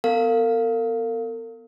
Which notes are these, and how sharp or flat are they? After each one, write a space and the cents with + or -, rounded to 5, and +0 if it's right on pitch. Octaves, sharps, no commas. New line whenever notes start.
B3 +5 A#4 -45 F5 +0